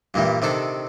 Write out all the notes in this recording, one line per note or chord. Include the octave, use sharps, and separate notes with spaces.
G2 A#2 E3 G3
C3 D#3 D4 A4